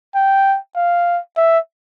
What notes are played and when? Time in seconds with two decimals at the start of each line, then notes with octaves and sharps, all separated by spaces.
0.15 G5
0.76 F5
1.37 E5